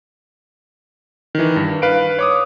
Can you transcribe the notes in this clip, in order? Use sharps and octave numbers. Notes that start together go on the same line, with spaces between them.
D#3 E3
G2
B4 F5 D7
C#5 D6 D#6